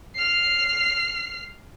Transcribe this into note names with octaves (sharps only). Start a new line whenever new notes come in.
F6 C7